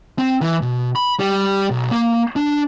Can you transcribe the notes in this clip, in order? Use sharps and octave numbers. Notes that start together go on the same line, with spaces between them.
C4
E3
B2
B5
G3
B1
A#3
D4